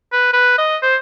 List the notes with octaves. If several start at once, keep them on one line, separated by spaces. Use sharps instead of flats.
B4
B4
D#5
C5